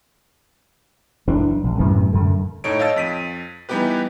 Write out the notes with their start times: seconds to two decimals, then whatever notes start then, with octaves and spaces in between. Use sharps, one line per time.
1.27 F#1 E3 D4
1.64 A#1
1.79 F#2 A2 C3 E3
2.13 F#2 D3
2.64 A2 D#4 A4 C#5 D7
2.79 C#5 D#5 F5 A5 E6 A6
2.96 F2 B6 D#7
3.69 E3 G3 B3 D#4 G4 B4